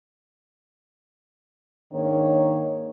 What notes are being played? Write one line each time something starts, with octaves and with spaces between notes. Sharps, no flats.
G#2 D#3 A#3 D4 C#5